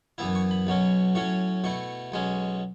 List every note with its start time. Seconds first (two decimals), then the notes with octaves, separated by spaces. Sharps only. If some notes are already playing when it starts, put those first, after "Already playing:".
0.18 F#2 E3 B3 E4 E5
0.35 C#6
0.51 B5
0.67 B1 B2 F#3 C#4
1.15 A2 F#3 C#4 C#6
1.64 B2 A3 E4 C#6
2.12 B1 B2 G#3 C#4